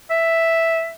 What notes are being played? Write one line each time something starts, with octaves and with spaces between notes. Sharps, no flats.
E5